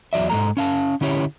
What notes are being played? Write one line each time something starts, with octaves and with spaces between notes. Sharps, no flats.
E2 F#3 D5 E5
G#2 G#3 A4 A#5
C#4 F5 A5
D3 C#4 E4 G4 C#5